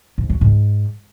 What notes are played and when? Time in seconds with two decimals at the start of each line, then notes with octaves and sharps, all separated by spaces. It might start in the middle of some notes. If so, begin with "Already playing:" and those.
0.18 G#2
0.30 F#3
0.41 G#2